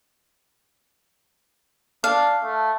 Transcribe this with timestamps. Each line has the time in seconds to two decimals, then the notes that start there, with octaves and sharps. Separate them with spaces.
2.04 D4 F5
2.43 A3